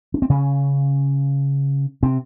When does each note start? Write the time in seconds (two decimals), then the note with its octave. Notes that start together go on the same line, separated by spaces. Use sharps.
0.14 C#4
0.22 C4
0.30 C#3 C#4
2.03 C3 C4